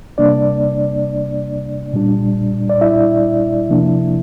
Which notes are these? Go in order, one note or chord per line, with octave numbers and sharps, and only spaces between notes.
C3 G3 A#3 D4 D5
A#2 G3 D4
D5
E4 E5
C3 F3 A#3 D4